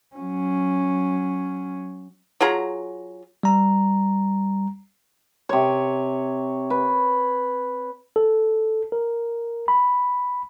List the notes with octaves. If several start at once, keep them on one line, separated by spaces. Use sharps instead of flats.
F#3 C#4
F#3 F4 G#4 A#5
G3 A#5
C3 C#5
B4
A4
A#4
B5